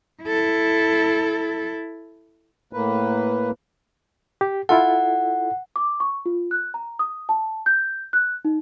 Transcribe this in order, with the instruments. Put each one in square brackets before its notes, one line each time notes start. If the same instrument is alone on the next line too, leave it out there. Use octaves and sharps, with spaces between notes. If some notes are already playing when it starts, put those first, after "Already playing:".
[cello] E4 A4
[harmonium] A2 A#3 B4
[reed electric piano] G4
[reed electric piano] E4 F4 A4 [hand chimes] F#5
[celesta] D6
C#6
F4
F#6
A#5
D#6
A5
G6
F#6
D#4